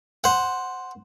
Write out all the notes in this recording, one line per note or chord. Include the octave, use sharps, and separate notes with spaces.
C5 F#5